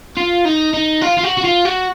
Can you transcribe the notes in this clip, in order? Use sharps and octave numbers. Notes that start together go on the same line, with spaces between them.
F4
D#4
D#4
F4
F4
F#4
F#4
F4
F#4